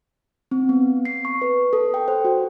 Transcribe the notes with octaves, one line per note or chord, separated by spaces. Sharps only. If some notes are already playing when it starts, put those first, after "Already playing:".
C4
B3
C7
C#6
B4
A4
G5
C5
F#4